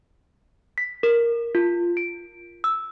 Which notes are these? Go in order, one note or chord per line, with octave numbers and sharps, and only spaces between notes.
B6
A#4
F4
D7
E6